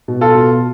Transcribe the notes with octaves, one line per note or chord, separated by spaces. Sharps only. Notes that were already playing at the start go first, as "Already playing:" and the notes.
B2
F4 A4
B2